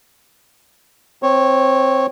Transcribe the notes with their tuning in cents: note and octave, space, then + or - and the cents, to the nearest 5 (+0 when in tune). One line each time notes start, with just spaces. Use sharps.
C4 +0 C#5 -15